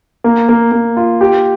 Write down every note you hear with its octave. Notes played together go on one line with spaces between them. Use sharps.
A#3
A#3
A#3
F4
G4